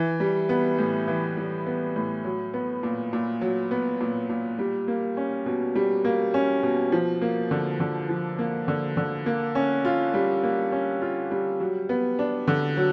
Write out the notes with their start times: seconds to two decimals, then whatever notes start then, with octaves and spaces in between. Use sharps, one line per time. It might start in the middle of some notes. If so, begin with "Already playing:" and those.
Already playing: E3
0.20 G3
0.49 B3
0.78 A2
1.08 E3
1.37 G3
1.66 B3
1.96 A2
2.24 F#3
2.54 B3
2.83 A#2
3.13 A#2
3.41 F#3
3.71 B3
4.01 A#2
4.29 A#2
4.59 G3
4.88 A#3
5.17 C#4
5.46 B2
5.75 G3
6.05 A#3
6.34 C#4
6.63 B2
6.92 F3
7.21 A#3
7.51 D3
7.80 D3
8.09 F3
8.39 A#3
8.68 D3
8.97 D3
9.26 A#3
9.55 C#4
9.85 F4
10.14 G3
10.43 A#3
10.72 C#4
11.02 F4
11.31 G3
11.60 F#3
11.89 B3
12.19 D4
12.48 D3
12.77 F#3